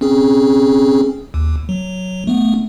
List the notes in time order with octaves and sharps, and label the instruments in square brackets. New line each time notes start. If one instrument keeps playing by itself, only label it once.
[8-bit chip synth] C4 C#4 G#4
D#2
F#3
A3 B3